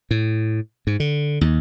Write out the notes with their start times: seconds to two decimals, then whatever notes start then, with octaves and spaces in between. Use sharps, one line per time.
0.11 A2
0.87 G#2
1.00 D3
1.41 D#2